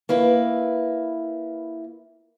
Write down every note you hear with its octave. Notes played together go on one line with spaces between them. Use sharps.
A#3 E4 B4